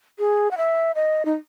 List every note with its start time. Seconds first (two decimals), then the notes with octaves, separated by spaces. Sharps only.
0.19 G#4
0.51 F#5
0.57 E5
0.95 D#5
1.25 D#4